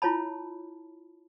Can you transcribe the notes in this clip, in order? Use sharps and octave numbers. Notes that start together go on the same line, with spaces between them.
E4 F4 C#5 A5 B5